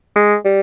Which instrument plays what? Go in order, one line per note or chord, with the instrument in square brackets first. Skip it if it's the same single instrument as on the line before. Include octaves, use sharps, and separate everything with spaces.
[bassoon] G#3
G3